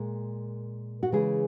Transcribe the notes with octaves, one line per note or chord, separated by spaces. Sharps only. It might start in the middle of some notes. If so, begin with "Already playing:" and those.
Already playing: A#2 G#3 A#4
F#4
C#3 E3 G#3 G#4